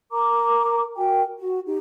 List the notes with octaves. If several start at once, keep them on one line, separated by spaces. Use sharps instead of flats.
A#4 A#5 D6
F#4 A#4 G5 G#5
F#4
D#4 G4